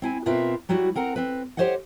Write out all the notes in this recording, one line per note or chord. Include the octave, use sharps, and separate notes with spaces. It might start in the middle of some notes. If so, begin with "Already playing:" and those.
C4 E4 G#5
B2 C4 F4 A#4 B4 E5
F#3 G3 E4 F#4
C4 A#4 F#5 A#5
C4 B4
G4 A#4 C5 C#5 D#5 F#5